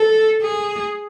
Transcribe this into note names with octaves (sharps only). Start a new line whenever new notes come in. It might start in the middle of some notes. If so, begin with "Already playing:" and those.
Already playing: A4
G#4